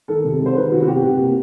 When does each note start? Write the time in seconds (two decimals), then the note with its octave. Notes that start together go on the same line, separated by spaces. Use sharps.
0.08 D#3 A4
0.24 C3
0.41 G#3
0.46 C5
0.56 D#3 B4
0.72 C3 F#4
0.83 F#4
0.88 C3 G4
1.03 C3
1.20 A#3